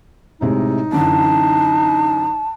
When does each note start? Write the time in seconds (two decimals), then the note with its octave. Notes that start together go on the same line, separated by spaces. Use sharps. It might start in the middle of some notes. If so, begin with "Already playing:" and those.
0.41 A2 C3 G#3 D#4
0.92 F#2 D3 E3 A5